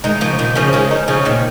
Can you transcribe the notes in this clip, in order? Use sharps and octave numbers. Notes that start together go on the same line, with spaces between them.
D#3 G#3 D#4
C#3 F3
A#2 D#3
C#3 F3 C#4
D#3 G#3 C#4
D#4
C#3 F3 C#4
A#2 D#3